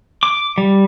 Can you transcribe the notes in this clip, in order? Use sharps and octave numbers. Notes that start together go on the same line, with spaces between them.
D6
G3